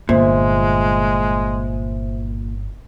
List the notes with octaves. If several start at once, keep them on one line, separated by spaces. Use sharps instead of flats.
G1 G2 A#2 G#3 C5 E5